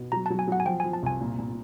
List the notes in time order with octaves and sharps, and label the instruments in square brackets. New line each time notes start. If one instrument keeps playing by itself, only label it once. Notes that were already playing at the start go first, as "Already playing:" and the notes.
Already playing: [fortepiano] B2
[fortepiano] F#3 [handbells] A#5
[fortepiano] F#3 [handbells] A5
[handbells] G#5
[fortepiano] F#3 [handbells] F#5
[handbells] G#5
[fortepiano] F3 [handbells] G5
[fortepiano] F3 [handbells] G#5
[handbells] A5
[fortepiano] C2 [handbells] G#5
[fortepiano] A#2
A#2